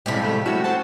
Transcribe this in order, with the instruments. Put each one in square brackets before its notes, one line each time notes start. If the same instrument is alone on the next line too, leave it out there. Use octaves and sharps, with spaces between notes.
[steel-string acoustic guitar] F2 G4 [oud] A2 C3 [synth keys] G3 G#3 B6
[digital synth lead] A3
[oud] C#4 [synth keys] E4 E6 [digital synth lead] F#4
[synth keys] C4 C5 A5